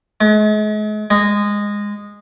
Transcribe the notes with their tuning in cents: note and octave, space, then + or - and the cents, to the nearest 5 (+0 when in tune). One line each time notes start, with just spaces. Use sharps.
G#3 +40
G#3 -15